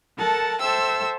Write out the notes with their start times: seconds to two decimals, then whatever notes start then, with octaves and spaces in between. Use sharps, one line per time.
0.17 A4 A#4 F#5 A5
0.59 A4 C5 E5 G5 E6